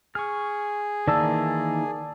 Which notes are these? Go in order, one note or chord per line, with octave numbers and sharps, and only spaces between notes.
G#4 C#6 F6
D#3 E3 A#3 D5 A5 E6